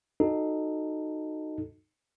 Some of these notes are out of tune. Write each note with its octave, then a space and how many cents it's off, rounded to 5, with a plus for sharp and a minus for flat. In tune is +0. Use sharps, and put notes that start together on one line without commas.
D#4 -10 F#4 +0 A4 +0